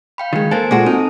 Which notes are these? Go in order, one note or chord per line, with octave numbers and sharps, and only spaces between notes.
F5 G5 B5
D#3 G#3
A#3 A4 A#4 C5 G#5
A#2 G#3 F#4 A4 A5
C4 D#4